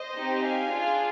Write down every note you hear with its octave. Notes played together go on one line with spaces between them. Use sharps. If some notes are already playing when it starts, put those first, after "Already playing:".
Already playing: C5 D#5
C4 D#4 G4
F5 G#5
D4 F4 G#4